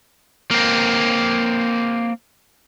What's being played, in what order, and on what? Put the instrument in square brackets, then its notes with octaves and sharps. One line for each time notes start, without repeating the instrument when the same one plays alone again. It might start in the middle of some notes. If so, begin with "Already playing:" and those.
[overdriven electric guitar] A#3 C4